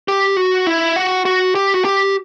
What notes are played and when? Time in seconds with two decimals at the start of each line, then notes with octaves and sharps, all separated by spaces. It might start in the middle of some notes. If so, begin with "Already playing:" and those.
0.08 G4
0.37 F#4
0.67 E4
0.96 F#4
1.25 F#4
1.55 G4
1.74 F#4
1.85 G4